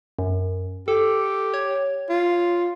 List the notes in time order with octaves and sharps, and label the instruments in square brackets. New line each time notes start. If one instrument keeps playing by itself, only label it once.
[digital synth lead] F#2
[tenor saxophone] G4 [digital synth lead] A4
[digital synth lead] C#5
[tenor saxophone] F4